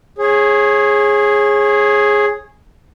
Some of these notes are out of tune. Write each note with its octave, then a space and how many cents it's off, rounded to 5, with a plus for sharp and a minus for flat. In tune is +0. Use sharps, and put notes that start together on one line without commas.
G#4 +0 C#5 -25